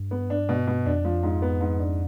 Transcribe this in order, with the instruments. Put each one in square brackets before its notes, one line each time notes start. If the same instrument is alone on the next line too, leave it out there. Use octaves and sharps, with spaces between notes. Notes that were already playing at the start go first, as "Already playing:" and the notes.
Already playing: [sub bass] G2
[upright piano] B3
D4
B2
B2
[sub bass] F2 [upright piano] D4
[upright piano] F3
G#2
B3
G#2
D4